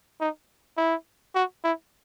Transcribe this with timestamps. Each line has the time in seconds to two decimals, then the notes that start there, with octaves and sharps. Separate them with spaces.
0.20 D#4
0.77 E4
1.35 F#4
1.64 E4